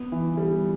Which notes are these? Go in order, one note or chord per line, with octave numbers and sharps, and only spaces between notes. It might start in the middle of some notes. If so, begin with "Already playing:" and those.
Already playing: B3
E3
G3